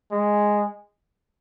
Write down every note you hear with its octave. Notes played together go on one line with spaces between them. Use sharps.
G#3